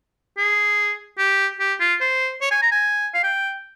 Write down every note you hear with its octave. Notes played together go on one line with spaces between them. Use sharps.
G#4
G4
G4
F4
C5
C#5
G#5
A#5
G#5
F5
G5